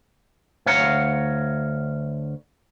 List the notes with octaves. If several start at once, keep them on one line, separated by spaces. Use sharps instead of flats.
D2 C#5 F5 F#5 A#5